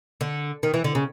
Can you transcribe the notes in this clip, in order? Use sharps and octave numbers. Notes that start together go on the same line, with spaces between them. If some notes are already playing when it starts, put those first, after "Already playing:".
D3
D#3
E3
D3
C#3